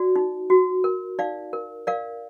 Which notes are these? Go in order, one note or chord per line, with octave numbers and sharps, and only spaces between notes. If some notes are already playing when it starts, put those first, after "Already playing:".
Already playing: F#4 D5
D#4
F#4
A#4
D#4 D5 F5
A#4
A#4 D5 F5